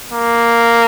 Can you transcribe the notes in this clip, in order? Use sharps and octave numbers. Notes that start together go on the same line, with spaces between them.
A#3